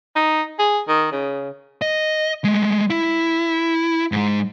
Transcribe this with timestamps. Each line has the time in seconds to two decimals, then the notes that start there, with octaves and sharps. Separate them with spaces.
0.16 D#4
0.59 G#4
0.88 D#3
1.12 C#3
1.82 D#5
2.44 G#3 A3
2.90 E4
4.12 G#2 G#3